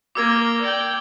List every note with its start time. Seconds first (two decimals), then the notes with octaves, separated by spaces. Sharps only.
0.15 A#3 A#4 D6 E6 G#6
0.61 D5 G5